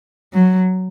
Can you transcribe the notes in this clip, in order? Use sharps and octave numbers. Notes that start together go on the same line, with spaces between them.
F#3